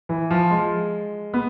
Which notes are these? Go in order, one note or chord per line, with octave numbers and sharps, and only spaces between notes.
E3
F3
G#3
B3